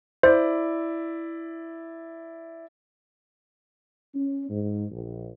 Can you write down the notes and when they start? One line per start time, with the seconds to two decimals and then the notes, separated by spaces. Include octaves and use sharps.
0.23 E4 C5 D5
4.15 C#4
4.50 G#2
4.91 A#1